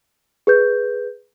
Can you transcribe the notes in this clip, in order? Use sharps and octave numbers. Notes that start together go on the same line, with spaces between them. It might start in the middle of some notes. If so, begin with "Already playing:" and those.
G#4 B4 G6